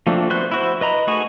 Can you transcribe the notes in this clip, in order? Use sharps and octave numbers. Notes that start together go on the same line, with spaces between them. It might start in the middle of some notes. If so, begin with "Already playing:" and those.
F3 A3 A#3 C4 D4
B3 F#4 C5 F#6
E4 F#4 C5
B4 D#5 A#5 B5
A3 D#4 F#4 G#4 C#6